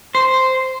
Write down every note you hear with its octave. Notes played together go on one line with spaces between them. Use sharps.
C5